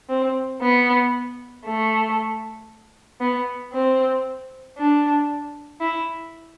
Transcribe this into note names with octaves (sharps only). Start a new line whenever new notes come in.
C4
B3
A3
B3
C4
D4
E4